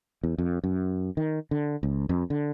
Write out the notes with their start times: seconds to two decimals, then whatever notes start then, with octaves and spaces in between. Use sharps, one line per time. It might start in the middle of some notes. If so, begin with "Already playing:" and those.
0.24 E2
0.38 F2
0.64 F#2
1.17 D#3
1.51 D3
1.83 C#2
2.09 F2
2.30 D3